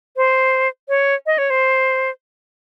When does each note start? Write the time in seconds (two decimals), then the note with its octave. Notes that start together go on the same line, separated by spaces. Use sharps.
0.17 C5
0.89 C#5
1.26 D#5
1.38 C#5
1.50 C5